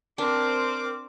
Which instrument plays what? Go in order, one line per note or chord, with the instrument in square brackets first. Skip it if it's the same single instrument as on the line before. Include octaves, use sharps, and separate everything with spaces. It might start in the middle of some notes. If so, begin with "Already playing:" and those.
[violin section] C4 D6 [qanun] D4 [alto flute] A#4